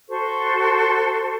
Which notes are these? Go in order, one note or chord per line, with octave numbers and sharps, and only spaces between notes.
F#4 A4 C5 C#6